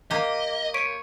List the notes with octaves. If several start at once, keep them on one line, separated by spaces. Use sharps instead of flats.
A#3 G4 D#5
C#5 B6 D7 D#7